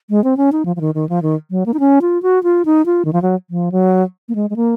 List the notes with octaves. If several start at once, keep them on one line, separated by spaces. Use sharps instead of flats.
G#3
C4
C#4
D#4
F3
F3
D#3
D#3
F3
D#3
F#3
A#3
D#4
C#4
F4
F#4
F4
D#4
F4
D#3
F3
F#3
F3
F#3
A#3
G#3
G#3
A#3